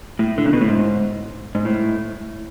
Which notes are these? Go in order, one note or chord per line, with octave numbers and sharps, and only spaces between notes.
A2
D3
C#3
B2
A2
G#2
G#2
A2